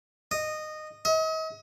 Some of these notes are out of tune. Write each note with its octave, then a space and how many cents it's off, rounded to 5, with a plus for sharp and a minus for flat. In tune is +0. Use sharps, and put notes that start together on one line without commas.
D#5 -15
D#5 +40